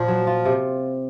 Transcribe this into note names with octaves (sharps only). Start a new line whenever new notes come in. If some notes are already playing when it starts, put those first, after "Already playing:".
Already playing: A#2 F3
F#3
F4
C3